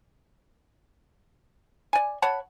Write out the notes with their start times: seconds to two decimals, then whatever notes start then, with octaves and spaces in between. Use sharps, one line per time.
1.93 D5 G#5
2.22 C#5 F#5 A5 B5